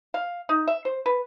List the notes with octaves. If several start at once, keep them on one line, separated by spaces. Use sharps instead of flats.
F5
D#4
E5
C5
B4